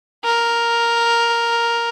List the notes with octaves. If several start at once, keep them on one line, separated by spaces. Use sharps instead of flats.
A#4